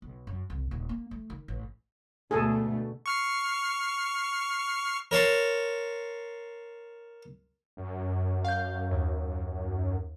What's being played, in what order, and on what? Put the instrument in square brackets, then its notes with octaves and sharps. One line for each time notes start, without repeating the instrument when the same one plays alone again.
[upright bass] B1
F#2
C2
D#1
A#3
A3
D#3
A1
[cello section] D2 B2 A3 [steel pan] G#4 A4
[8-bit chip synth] C#6 F6 C7
[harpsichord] A#4 C#5 A5 C6
[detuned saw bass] F#2
[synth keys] F5 G6
D#2